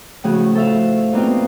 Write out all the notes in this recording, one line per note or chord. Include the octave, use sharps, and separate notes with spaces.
A2 C#3 F3 A3 F#4 G#4
A4 C5 E5 F5
G2 B2 A#3 C4 D#4 F4